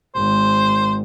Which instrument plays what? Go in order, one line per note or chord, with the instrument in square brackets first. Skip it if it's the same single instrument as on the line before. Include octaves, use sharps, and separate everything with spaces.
[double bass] G#1 [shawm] C5